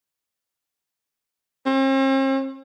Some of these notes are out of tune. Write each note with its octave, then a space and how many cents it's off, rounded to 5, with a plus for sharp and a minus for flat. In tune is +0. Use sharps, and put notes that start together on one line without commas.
C4 +45